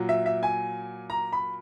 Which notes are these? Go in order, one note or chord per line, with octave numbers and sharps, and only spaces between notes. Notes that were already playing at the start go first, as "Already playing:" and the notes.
Already playing: A#2 F#3
E5
E5
G#5
A#5
B5